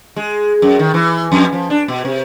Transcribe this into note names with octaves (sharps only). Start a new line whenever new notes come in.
G#3
F#2
D#3
E3
F2
F3
D4
B2
C3